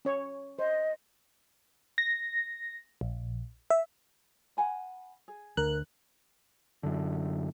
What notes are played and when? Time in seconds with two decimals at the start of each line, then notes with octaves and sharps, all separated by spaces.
0.05 C#4 C#5
0.59 C5 D#5
1.98 A#6
3.01 A#1
3.70 E5
4.57 F#5 G#5 B5
5.28 G#4
5.57 D2 A#4 F#6
6.83 F#2 D3